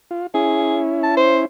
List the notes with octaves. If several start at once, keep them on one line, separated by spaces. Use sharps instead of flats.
F4
C#4 E4 G#4
A5
C5